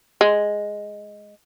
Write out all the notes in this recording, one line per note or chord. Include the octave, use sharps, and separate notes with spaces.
G#3